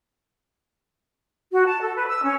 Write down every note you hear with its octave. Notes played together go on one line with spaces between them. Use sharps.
F#4
A5
A4
B4
E6
C#4